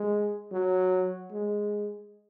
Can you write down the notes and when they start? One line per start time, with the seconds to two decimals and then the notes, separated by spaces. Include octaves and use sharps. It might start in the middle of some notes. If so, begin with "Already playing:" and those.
Already playing: G#3
0.52 F#3
1.32 G#3